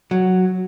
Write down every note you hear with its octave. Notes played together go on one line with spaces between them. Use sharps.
F#3